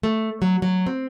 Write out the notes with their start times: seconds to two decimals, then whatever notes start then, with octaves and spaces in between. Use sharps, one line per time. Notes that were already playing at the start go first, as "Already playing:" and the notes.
0.03 A3
0.42 F#3
0.62 F#3
0.86 C4